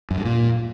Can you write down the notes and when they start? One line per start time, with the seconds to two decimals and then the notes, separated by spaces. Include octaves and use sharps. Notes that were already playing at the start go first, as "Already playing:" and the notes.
0.11 F#2
0.18 G2
0.25 A#2